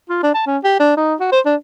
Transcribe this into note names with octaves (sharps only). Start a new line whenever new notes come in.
F4
D4
A5
C#4
G4
D4
D#4
F#4
C5
D4